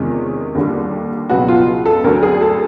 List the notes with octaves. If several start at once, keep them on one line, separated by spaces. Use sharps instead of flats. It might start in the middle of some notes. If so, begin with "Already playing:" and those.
Already playing: E2 C3 D#3 G#3 C#4 F4
D#2 D3 G3
C#2 B2 F#3 B3 F#4
F4
A4
D2 D3 F#3 A#4
G#4
A4